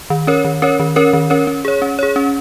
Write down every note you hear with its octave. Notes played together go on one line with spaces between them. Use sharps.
D#3
C#4 A#4 C#5
D#3
C#4 A#4 C#5
D#3
C#4 A#4 C#5
D#3
C#4 A#4 C#5
C#4
G#4 C#5
C#4
G#4 C#5
C#4